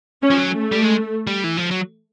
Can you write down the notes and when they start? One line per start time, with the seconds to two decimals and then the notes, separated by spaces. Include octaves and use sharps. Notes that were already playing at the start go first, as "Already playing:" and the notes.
0.22 C#4
0.30 F3
0.37 F#3
0.52 A3
0.72 G3
0.82 G#3
1.27 G3
1.44 E3
1.57 F3
1.71 F#3